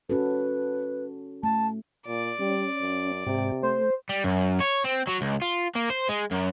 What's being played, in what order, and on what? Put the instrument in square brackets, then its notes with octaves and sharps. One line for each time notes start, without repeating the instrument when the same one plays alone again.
[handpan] C#4 F#4 A4 [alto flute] B4
[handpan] A3 [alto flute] A5
[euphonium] A#2 [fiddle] D5
[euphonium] G3 [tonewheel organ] C#4
[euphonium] F#2
[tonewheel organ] G#2 G4 [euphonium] C3
[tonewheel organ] A3 [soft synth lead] C5
[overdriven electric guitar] G3
F#2
C#5
C4
F#3
C#2
F4
A#3
C5
G#3
F#2